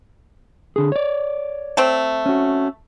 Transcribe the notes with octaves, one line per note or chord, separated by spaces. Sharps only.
D3 G#4
C#5 D5
A3 C4
C#4 F#4